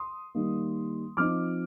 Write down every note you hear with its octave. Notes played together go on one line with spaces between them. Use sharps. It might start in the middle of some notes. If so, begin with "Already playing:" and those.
Already playing: C6 D#6
D#3 G3 A#3 D#4
F3 C4 D#4 D6 F6